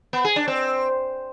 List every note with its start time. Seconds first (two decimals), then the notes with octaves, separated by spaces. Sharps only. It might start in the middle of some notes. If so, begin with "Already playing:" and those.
0.13 B3
0.25 G#4
0.36 D4
0.48 C4